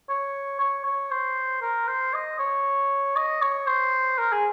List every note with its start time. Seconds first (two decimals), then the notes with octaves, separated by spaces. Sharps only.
0.09 C#5
0.60 C#5
0.85 C#5
1.11 C5
1.62 A#4
1.88 C5
2.13 D#5
2.39 C#5
3.16 D#5
3.42 C#5
3.67 C5
4.18 A#4
4.32 G#4